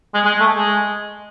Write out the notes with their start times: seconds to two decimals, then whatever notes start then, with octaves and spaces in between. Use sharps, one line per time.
0.14 G#3
0.25 G#3
0.40 A3
0.56 G#3